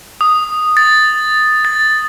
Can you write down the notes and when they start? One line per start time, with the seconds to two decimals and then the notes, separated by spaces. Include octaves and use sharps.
0.21 D#6
0.77 A6
1.65 A6